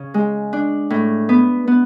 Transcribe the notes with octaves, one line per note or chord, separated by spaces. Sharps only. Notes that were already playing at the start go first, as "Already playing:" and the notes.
Already playing: C#3
G#3
D4
A2
B3
B3